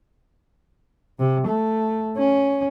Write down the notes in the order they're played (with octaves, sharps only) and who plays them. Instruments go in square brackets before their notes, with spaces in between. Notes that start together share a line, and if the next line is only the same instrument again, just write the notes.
[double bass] C3
A3
C#4